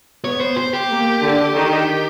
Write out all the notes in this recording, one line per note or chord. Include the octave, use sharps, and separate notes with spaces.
B3 C#5
C5
C5
G4
A#3
D3 D4
D#3 D#4